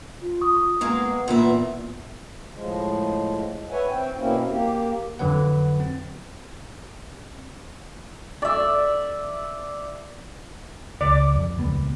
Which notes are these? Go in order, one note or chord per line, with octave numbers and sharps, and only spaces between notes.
F4
C#6 D#6
G#3 A#3 B3 G#4
A#2 E3 E4
A2 F3 G#3
B4 C#5 E5 F#5 G#5
C4 G5
B2 A#3 C4 C#4 E4
A#3 G4
F2 D3 F#3 B4 F#5
C4
D5 E5
C#2 D5
F2
D#1 C#2 B3